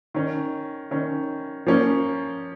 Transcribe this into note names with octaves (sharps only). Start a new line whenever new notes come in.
D#3 C#4
D#3 C#4
F3 A#3 C#4